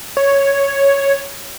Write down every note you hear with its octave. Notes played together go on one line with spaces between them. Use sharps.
C#5